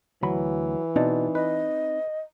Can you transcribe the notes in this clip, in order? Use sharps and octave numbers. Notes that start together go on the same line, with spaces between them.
D2 E3 F#3 B5
B2 C4 D#4 D5 A5
B4 D#5